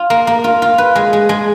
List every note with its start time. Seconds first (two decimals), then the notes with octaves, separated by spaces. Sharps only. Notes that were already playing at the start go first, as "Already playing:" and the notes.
Already playing: F4
0.10 A#3
0.27 A#3
0.44 F4
0.62 F4
0.78 B4
0.96 G#3
1.13 G#3
1.29 G#3